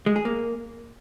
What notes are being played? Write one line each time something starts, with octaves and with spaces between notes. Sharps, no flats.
G#3
G#4
A#3